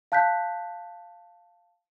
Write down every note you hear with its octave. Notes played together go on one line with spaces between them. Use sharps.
F5 A5 F#6 G6 B6